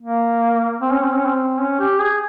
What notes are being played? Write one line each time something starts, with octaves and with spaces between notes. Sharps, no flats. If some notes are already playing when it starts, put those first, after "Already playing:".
A#3
C4
C#4
C4
C#4
C4
C#4
G4
G#4